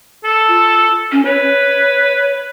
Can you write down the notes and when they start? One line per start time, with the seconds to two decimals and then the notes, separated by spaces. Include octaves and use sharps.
0.24 A4
0.48 F4
1.12 C#4
1.26 B4 C#5